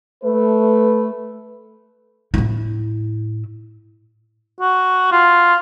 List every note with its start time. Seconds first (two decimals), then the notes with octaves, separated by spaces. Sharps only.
0.23 A3 B4
2.34 A2 E4
4.60 F#4
5.12 F4